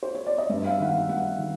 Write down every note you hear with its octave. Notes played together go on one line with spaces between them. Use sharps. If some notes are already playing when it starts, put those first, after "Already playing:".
C5
C#5
D5
D#5
G2 E5
F5
E5
D#3 F#5
F5
G2 F#5
D#3